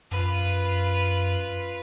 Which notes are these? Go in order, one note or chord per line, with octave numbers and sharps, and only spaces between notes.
F#2 F4 B4